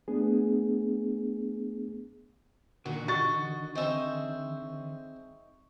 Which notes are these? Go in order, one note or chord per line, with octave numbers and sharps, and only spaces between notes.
A3 B3 D4 G#4
A#2 D3 D#3 F#4
F#4 D#5 C#6 A6
C4 D#4 G#4 C5 E5